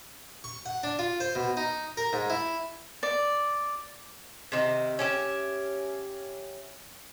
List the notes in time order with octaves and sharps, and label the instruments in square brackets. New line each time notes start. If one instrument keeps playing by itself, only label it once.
[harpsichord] C#6
F#5
D4
F4
C5
B2
D#4
A#4
G#2
E4
[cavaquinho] D5
[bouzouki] C3 D#3
C#4 G4 E5